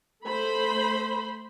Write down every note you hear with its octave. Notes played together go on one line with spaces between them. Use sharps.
A3 C5 B5